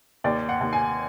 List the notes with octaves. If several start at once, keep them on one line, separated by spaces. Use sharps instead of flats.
D#2 D5
F#5
D#2
G#5